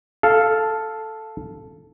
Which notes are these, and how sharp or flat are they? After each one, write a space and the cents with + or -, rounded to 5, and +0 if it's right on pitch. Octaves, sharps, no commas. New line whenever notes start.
A4 +0 F5 +0